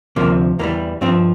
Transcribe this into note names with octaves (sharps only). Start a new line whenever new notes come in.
D2 C3 F3 A#3
E2 E3 G3 A#3
G2 F3 C4